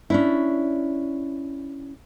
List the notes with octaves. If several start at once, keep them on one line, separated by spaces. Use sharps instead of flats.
C#4 D4 E4